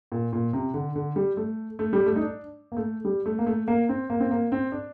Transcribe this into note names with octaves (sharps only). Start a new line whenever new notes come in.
A#2
A#2
C3
D3
D3
G3
A3
A3
G3
A3
D#4
D4
A#3
A3
G3
A3
A#3
A3
A#3
C4
A#3
C4
A#3
C4
D4